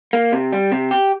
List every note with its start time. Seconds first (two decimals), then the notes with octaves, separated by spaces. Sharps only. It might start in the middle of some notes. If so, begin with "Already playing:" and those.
0.13 A#3
0.32 C3
0.52 G3
0.72 C3
0.91 G4